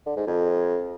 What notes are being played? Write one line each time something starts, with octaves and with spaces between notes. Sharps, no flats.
D3
G#2
F2